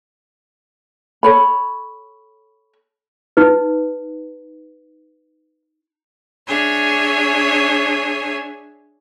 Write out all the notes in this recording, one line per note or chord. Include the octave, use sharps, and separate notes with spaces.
A4 C#5 B5
D#4 B4
D4 G#4 C#5 E5 G#5